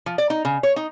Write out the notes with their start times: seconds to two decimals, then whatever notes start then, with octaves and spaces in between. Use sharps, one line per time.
0.06 F3
0.18 D5
0.30 D#4
0.45 C#3
0.63 C#5
0.76 D#4